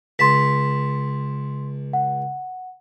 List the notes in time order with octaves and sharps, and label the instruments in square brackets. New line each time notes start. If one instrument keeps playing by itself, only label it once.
[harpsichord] C#2 A5 [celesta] C6 B6
[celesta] F#5